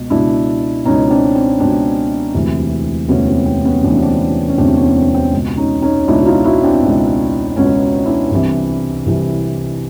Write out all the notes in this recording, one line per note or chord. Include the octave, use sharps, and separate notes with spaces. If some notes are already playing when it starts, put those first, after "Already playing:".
Already playing: C#2 B2
C#2 B2 D4 E4
C#2 B2 C#4 D#4
C4 D4
C4
C#2 B2 C4 D4
E1 D2 C3 E3
E1 D2 C3 E3 B3 C#4
C4
C4
B3 C#4
E1 D2 C3 E3 D4
C#4
C4 D4
C#4
E1 D2 C3 E3 C4 D4
B3 C#4
C4
C4
C#2 B2
C#4 D#4
C#4 D#4
C#2 B2 D4 E4
F#4
D#4 F4
E4 F#4
C4 D4
C#2 B2
C#2 B2 B3 C#4
D4 E4
C2 C3 E3
C2 C3 E3